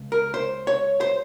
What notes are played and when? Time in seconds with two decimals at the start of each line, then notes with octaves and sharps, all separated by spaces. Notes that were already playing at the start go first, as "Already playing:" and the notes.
Already playing: C#2
0.12 A#4
0.34 C5
0.67 C#5
1.01 C5